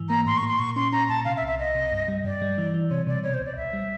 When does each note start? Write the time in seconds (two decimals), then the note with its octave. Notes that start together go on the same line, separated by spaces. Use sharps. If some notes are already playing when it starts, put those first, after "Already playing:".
Already playing: G#2 E3
0.09 A#3 A#5
0.26 A2 C6
0.37 C#6
0.43 A#3
0.49 C6
0.59 A#2 C#6
0.76 C#4 C6
0.92 C#4 A#5
1.09 A#2 A5
1.25 C3 F5
1.37 E5
1.42 C2
1.47 E5
1.59 C2 D#5
1.75 C3
1.92 G2
2.08 G3
2.24 G2 D5
2.42 G3
2.58 E3
2.74 E3
2.90 C3 C#5
3.07 C3 D5
3.23 B2 C#5
3.34 C5
3.40 C#2
3.46 D5
3.56 C#2 E5
3.73 G3